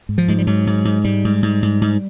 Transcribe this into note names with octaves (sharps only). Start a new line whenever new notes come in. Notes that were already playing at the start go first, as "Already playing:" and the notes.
G#2
F3
G#2 G#3
G3
G#2 F#3
G#2
G#2
G#2 G3
G#2
G#2
G#2
G#2